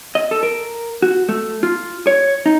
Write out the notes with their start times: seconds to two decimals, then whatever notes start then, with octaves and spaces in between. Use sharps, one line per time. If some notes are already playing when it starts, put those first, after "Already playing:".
0.15 D#5
0.31 A4
0.43 A#4
1.02 F#4
1.29 A3
1.63 F4
2.07 C#5
2.46 D#4